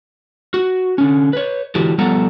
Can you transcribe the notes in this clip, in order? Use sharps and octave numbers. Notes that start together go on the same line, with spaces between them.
F#4
D3 C#4
B4 C#5
D3 E3 E4 F#4 G4
F3 G3 B3 A4 F#5 A#5